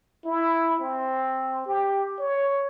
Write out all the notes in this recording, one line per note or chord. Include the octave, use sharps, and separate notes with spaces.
E4
C4
G4
C#5